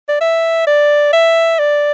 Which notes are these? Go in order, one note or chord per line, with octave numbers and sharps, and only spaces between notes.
D5
E5
D5
E5
D5